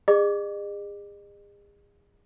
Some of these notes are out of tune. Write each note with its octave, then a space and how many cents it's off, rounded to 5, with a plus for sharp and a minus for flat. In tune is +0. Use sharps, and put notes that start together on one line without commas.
G#4 -35 D#5 -45 D6 +0